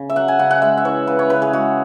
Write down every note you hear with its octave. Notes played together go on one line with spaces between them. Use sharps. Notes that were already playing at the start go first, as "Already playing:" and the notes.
Already playing: C#3
E5
F#3 F#5
G#5
C#3 F#5
F#5
G#3 E5
E5
E3 C#5
C#3 B4
C#5
C#3 B4
G#4
G#3 F#4